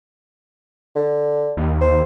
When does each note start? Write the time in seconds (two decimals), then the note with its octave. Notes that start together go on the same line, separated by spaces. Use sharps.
0.96 D3
1.57 D#2
1.81 C5